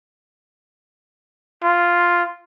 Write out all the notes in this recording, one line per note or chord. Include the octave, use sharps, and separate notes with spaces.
F4